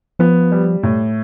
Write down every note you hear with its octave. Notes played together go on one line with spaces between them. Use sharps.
F3 B3
G3
A2